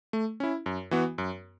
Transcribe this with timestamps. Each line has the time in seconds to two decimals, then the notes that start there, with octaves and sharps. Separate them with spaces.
0.13 A3
0.40 C#4 E4
0.66 F#2
0.91 E3 B3 F#4
1.18 F#2